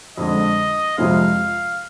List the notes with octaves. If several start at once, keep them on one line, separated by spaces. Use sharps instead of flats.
F2 D3 G#3 D#5
F2 C3 F3 G#3 C4 F5